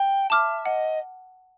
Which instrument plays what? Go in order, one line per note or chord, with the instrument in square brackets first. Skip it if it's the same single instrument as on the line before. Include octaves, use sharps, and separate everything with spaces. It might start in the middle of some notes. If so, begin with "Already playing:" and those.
Already playing: [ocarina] G5
[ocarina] E5 [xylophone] A5 D6 F6
[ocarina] D#5 [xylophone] F#5